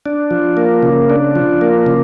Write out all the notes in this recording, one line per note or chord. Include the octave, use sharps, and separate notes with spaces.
D4
F3
A#3
C#3
D4
F3
A#3
C#3